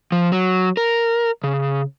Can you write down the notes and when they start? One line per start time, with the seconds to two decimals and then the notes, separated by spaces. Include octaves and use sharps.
0.12 F3
0.32 F#3
0.77 A#4
1.44 C#3